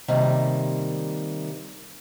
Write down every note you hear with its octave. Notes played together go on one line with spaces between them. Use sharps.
C3 D#3 G3 A#3